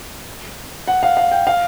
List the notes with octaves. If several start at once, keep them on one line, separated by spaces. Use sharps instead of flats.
F#5
F5
F5
G5
F5